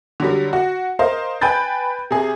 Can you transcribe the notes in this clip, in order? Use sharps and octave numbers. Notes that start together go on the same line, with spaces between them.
D3 F#3 G3
F#4
A#4 C5 D#5 F5
B4 G5 G#5 B5 G6 A6
C3 G#4